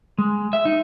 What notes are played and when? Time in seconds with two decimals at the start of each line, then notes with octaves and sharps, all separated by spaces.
0.18 G#3
0.53 E5
0.65 D#4